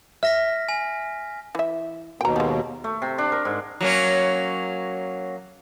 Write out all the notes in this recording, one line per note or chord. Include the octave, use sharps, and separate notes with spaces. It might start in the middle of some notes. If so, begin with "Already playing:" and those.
E5 F6 A#6 B6
G#5
E3 E5
D#2 B2 G5 A#5
F3 G#3
A3
C3
D4
A#4
G#2
F#3 A#3 C#4